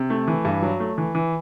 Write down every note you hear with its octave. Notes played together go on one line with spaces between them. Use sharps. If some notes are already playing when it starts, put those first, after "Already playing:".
Already playing: C3
A3
E3
G2
F#3
A3
E3
E3